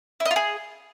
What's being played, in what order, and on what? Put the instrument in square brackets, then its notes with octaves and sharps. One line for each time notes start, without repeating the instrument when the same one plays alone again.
[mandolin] E4
D#5
F4
G#4